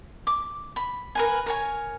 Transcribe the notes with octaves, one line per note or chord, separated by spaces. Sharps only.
D6
B5
A#4 B4 G#5
A#4 C#5 G#5